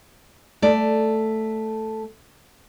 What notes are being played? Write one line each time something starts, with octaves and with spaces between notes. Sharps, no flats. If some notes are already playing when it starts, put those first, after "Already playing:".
A3 D5